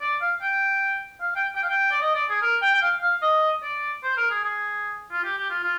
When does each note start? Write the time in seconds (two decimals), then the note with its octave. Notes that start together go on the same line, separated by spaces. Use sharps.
0.01 D5
0.21 F5
0.42 G5
1.21 F5
1.35 G5
1.55 G5
1.63 F5
1.69 G5
1.91 D5
2.01 D#5
2.15 D5
2.29 G#4
2.42 A#4
2.62 G5
2.74 G5
2.82 F5
3.02 F5
3.22 D#5
3.63 D5
4.03 C5
4.17 A#4
4.30 G#4
4.43 G#4
5.12 F4
5.24 G4
5.38 G4
5.50 F4
5.63 F4